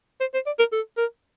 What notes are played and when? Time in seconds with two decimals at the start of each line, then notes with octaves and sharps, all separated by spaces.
0.21 C5
0.34 C5
0.46 D5
0.59 A#4
0.73 A4
0.97 A#4